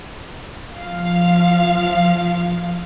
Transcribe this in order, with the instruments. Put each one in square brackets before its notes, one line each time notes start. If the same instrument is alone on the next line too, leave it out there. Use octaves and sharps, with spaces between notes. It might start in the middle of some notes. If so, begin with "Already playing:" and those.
[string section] F3 F5